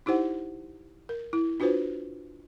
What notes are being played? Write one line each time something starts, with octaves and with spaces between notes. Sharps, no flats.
D#4 E4 G4 C5 F#5
A#4
E4
D4 F4 F#4 B4 C5